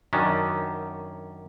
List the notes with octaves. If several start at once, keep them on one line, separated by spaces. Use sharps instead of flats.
F#2 D#3 C#4 D4